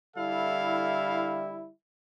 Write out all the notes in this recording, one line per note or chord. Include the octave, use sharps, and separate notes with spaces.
D3 G3 E4 A4 F5